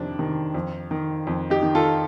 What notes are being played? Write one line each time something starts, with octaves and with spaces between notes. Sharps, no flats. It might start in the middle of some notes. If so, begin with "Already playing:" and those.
Already playing: F2 C3 D#3 D4
C3 D#3
F2
D#3
F2
D#4 G4
D#3
F4 A4